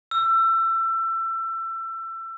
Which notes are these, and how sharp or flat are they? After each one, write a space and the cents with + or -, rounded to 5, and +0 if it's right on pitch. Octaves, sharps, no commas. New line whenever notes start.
E6 +25